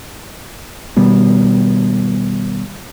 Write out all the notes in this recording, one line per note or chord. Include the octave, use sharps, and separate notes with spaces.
B2 D#3 G3 B3